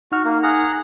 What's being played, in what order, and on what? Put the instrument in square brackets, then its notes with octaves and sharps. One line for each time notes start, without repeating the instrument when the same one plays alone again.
[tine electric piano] D#4 F6 [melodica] F#4
[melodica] A#3
G#4 F#5 A#5